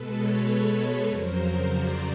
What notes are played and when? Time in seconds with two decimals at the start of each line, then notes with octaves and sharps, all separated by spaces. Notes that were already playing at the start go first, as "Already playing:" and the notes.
Already playing: B2 G#3 A4 B4
0.12 B4 C#5
1.04 F2 C#3 F#3 A#4 C5
1.65 C5 D5